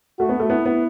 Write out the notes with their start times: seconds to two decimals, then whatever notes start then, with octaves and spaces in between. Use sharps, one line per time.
0.19 A3 F#4
0.29 B3
0.40 A3
0.50 B3 E4
0.65 B3